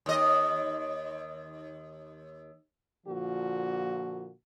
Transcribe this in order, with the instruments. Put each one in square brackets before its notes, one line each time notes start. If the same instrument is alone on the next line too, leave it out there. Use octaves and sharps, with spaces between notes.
[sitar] D#2 D#5
[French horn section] A#2 D3 F3 A#3 F#4